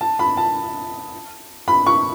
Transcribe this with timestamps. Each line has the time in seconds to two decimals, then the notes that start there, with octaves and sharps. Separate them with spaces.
0.01 A5
0.19 B5
0.37 A5
1.68 B5
1.86 C#6